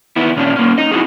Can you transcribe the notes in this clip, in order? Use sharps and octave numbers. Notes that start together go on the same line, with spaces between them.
D#3 B3 E4
A#2 C#4 D4
A#3 C#4
D#4 D#5
C4 E4 F#4 G#4